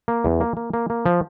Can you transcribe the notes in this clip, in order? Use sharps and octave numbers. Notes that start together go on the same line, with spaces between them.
A#3
E2
A#3
A#3
A#3
A#3
F3